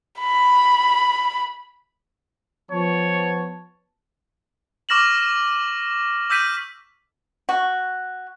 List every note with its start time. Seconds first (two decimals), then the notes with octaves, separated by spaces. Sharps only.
0.19 B5
2.72 F3 B3 C#5 A5
4.89 C#6 D6 F6 A#6 E7 F#7
6.30 D6 E6 G6 B6 D#7
7.49 F#4